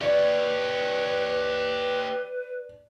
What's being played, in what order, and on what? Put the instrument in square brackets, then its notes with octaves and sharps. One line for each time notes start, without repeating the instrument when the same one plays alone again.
[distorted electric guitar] G4 C#5 [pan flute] B4 [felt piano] D5